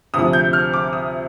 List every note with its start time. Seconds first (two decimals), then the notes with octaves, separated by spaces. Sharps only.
0.14 D2 C3 F3 D#6
0.33 G6
0.53 F6
0.73 D6
0.93 D#6